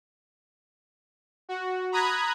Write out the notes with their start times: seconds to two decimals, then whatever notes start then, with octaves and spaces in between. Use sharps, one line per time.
1.49 F#4
1.92 A#5 B5 D#6 F#6 G#6